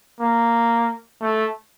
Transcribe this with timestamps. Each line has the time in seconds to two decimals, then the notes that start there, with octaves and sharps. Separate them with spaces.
0.20 A#3
1.21 A3